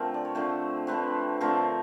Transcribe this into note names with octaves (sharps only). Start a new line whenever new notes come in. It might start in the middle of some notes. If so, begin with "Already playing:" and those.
Already playing: D3 F3 A3 C4 A#4
D5
C#5
D3 F3 A3 C4 C5
D3 F3 A3 C4 B4
D3 F3 A3 C4 A#4